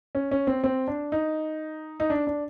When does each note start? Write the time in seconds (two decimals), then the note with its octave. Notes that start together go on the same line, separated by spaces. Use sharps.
0.15 C#4
0.31 C#4
0.47 C4
0.64 C4
0.88 D4
1.12 D#4
2.00 D#4
2.10 D4
2.27 D4